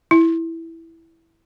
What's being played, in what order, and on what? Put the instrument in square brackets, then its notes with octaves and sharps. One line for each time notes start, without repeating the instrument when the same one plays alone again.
[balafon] E4